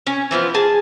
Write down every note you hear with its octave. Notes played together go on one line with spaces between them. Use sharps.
C#4
E3 F3 B3 F4
G#4 G#5 A5